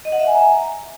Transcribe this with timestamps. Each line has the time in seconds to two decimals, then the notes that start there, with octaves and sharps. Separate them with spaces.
0.05 D#5
0.12 F#5
0.20 E5
0.27 G#5
0.34 A#5